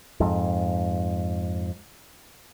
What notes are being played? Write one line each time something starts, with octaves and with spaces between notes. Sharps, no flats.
F2 G#2